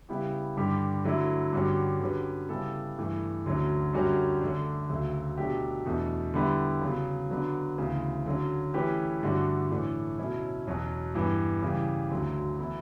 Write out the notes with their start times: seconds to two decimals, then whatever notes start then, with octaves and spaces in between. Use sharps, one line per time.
0.09 C#3 G3 B3 E4 G4
0.57 G2 D3 G3 D4 G4
1.04 D3 F#3 A3 E4
1.53 G2 D3 G3 C#4 F#4
2.01 D3 F#3 C#4 G4 B4
2.49 C#3 G3 B3 E4 A4
2.98 G2 E3 A3
3.46 D2 D3 F#3 C#4
3.93 F#2 D3 G3 C#4 F#4
4.41 D3 A3 D4
4.89 D2 C#3 F#3 A3
5.37 B2 F#3 A3 D4 G4
5.86 E2 B2 A3 D4
6.34 D3 G3 B3 E4
6.82 C#3 F#3 B3
7.30 D3 F#3 B3 D4
7.78 D2 C#3 E3 B3
8.26 D3 F#3 C#4
8.74 E3 A3 C#4 G4 B4
9.22 G2 D3 A3 D4 F#4
9.70 A2 E3 A3 D4
10.18 B2 F#3 C#4 E4
10.67 E2 B2 F#3 C#4 F#4
11.14 G2 E3 B3
11.63 C#3 E3 G3
12.11 D2 D3 F#3
12.59 E3 B3 E4 A4